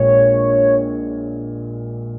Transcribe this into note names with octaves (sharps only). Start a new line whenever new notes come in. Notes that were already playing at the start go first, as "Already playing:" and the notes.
Already playing: A#1 A#2 G#3 C#5